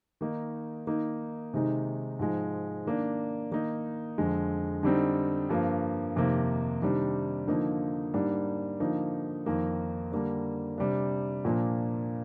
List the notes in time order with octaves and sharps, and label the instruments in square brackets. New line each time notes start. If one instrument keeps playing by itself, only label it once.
[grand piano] D#3 A#3 D#4
D#3 A#3 D#4
C3 D#3 G#3 D#4
G#2 F3 G#3
D#3 A#3 D4
D#3 A#3 D#4
F2 D3 G#3
D3 G3 C4 D#4
G2 F3 A#3
F2 C3 D#3 A#3
C3 D#3 G3 D4
D3 F3 A#3 D#4
G#2 G3 A#3 D4
D3 F3 A#3 D#4
F2 D#3 A#3
D3 G3 A#3 D4
C3 G3 D4
A#2 F3 A#3 D4